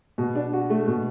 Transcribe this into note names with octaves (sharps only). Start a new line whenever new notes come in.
B2
D4
F#4
A3
B2